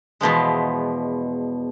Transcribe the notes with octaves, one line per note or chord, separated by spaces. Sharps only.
E2 B2 F3 G#3